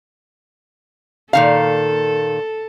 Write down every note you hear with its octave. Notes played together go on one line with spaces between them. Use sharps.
A#2 D#3 A4 F5